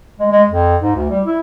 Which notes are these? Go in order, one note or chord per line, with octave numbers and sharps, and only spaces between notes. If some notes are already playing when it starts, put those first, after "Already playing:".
G#3
G#3
F2
G#2
D2
G3
E4